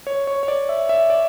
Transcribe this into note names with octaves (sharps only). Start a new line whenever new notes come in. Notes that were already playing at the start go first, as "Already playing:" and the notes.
C#5
C#5
C#5
D5
E5
E5
D5